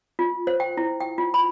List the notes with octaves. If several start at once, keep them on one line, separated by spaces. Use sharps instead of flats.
F4
C5
G5
E4
G5
F4
B5